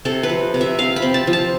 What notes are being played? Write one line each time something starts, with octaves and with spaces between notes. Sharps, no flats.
C3 A4
B4
F3
C3
E5
C4 F5
B5
C4
A5
F3
A5